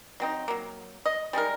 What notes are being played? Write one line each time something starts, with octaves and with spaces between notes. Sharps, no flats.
F#3 C4 D#4
F#3 A#3
D#5
G3 G#3 D#4 A#4